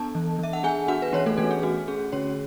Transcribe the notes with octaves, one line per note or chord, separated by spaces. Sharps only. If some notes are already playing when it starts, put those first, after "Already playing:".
Already playing: B3 D4 A4 A5
E3
E3 E5
F#5
B3 G#4 G#5
D4 F#4 F#5
B4
E3 C#4 C#5
A3 A4
E3 A3 A4
G#4
A3 F#4
C#4 G#4
D3 C#4 C#5